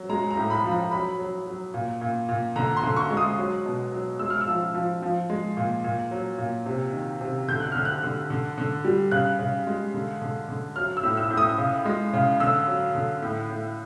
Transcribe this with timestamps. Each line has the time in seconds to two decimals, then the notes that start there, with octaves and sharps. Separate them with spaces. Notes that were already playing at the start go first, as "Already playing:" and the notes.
Already playing: F#3
0.09 G#3 A#5
0.31 A#5
0.37 A2
0.50 B5
0.65 F3
0.72 A#5
0.91 F#3 B5
1.19 F#3
1.47 F#3
1.74 A#2
2.01 A#2
2.28 A#2
2.56 D3 A#5
2.77 C6
2.83 D3
2.97 C#6
3.10 G#3
3.17 D#6
3.38 F#3
3.66 B2
3.92 F#3
4.19 G#3 E6
4.30 F6
4.41 E6
4.48 F3
4.74 F3
5.02 F3
5.30 G#3
5.57 A#2
5.84 A#2
6.11 F#3
6.38 A#2
6.66 C3
6.93 D#3
7.21 C3
7.48 D3 G6
7.60 F#6
7.72 D3 F6
7.85 F#6
8.03 D3
8.30 D3
8.58 D3
8.85 G3
9.11 C#3 F#6
9.39 C#3
9.67 G#3
9.94 D3
10.22 D3
10.48 D3
10.76 F#3 F6
10.97 E6
11.03 A2
11.17 E6
11.31 A2
11.37 D#6
11.58 C#3
11.86 G#3
12.13 C#3
12.40 D3 E6
12.68 F#3
12.95 D3
13.22 A2
13.49 A2